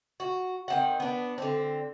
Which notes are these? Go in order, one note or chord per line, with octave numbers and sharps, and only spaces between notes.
F#4
D#3 C4 F#5
B3 D4
D3 C4